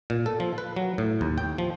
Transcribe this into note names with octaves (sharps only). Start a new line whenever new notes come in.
A#2
A4
F3
B4
F#3
A2
D#2
G5
F3